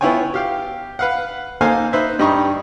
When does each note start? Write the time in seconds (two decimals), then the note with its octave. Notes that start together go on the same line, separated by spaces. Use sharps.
0.01 B3 E4 F4 C#5 G5 G#5
0.34 G4 F5 G5
0.99 B4 F5 F#5
1.61 A#3 D#4 A4 C5 F5 G#5
1.93 D#4 B4 C5 E5
2.19 G2 G3 D#4 D#5 A#5 C#6